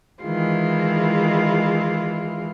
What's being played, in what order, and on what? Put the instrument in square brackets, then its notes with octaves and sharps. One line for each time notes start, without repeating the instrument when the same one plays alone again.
[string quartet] D#3 E3 G#3 E4 F4